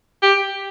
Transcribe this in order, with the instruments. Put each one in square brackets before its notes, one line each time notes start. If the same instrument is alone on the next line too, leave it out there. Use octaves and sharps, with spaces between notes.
[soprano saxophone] G4